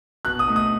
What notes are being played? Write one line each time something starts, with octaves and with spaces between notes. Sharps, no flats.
B2 F#6
D#6
A3 D#4
D#6